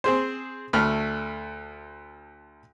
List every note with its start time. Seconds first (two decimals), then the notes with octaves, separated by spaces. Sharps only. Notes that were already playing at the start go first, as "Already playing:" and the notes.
0.04 C4 G#4 C5
0.73 D2 A3 B5 F6